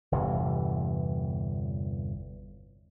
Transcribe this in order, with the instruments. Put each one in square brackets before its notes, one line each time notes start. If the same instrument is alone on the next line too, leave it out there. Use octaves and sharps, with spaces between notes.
[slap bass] G1 E2 C3 E3